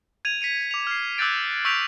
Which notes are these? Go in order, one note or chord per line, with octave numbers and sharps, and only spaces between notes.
G#6 D#7 F7
B6 C#7 D#7 F7
D6 F7
F6 C7
D6 E6 F#6 G6 A6 D7
C#6 E6 G6 B6 D7 F7